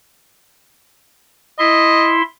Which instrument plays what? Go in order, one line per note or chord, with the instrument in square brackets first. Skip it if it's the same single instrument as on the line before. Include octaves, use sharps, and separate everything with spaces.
[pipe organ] E4 E5 C6 [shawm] D#5